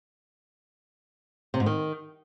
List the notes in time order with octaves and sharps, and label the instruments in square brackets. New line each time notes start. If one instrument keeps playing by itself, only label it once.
[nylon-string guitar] C3
G#2
D#3